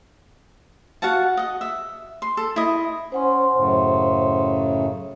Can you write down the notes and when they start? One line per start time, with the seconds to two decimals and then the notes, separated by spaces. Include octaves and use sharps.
1.02 F#4 F5 F#5 A5
1.37 D#5 F#5
1.61 E5
2.22 C6
2.37 A4
2.56 E4 D#5
3.12 C#4 C5 F#5 C6
3.55 F#2 A2 C#3